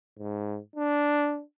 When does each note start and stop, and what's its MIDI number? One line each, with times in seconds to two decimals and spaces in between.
0.19 0.59 44
0.76 1.42 62